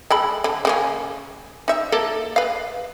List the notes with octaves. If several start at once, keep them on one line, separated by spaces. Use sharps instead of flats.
G#3 A4 B5
D3
C#3 A#3 C#4
D#4 E5
A#3 A4 A#4
B4 F5